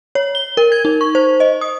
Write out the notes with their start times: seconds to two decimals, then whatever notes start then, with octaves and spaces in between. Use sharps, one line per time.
0.15 C#5
0.35 G7
0.57 A#4
0.72 G#6
0.85 D#4
1.01 C#6
1.15 C5
1.40 D#5
1.61 D#6